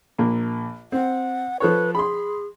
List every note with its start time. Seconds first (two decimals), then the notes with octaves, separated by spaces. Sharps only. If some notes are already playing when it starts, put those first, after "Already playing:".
0.18 A#1 A#3
0.92 C4 F#5
1.60 F3 A4 B4 C#5
1.95 G#4 B5 C6